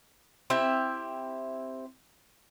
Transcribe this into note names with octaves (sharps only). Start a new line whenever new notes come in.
C4 E4 G4 E5